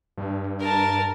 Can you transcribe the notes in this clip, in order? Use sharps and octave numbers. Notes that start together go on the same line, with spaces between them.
G2
A#4 A5